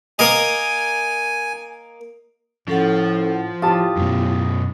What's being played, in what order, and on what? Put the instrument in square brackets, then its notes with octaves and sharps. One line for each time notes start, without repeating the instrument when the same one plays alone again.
[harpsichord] A#3 A#4 D#5 [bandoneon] G#5
[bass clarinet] A2 [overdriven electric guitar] F3 [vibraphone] C#4 A4 F#5
[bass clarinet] A2 [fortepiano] F4 G4 A5 [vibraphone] D#6
[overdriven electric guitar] F#2 B2